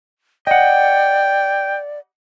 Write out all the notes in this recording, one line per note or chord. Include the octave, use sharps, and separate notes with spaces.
D5 D#5 F#5 G5